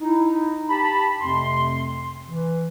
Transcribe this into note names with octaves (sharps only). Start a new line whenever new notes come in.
D#4 E4
G4 A5 B5
F2 C3 A3 C4 C6
E3